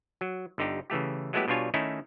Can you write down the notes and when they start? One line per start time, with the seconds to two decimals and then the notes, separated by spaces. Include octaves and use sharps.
0.21 F#3
0.58 G1 D3 D#4 G4
0.90 C#3 E3 A3 G4
1.33 F#3 G#3 A3 B3 E4 G4
1.48 B2 G3 D4 F4 C#5 G#5
1.74 D#3 A3 C#4 D#4 E4